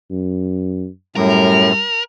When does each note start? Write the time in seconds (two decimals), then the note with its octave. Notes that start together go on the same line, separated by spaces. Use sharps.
0.11 F#2
1.16 F#2 A2 G3 A#4